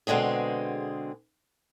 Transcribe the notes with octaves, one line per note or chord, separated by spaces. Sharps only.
B2 D3 G#3 C4 G#4